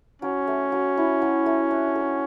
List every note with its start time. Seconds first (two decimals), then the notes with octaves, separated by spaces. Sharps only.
0.22 F#3 C#4
0.47 A3
0.72 F#3
0.97 E4
1.22 F#3
1.46 A3
1.71 D4
1.95 A4